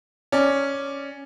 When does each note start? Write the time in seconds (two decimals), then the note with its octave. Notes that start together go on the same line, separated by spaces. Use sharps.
0.32 C#4 D5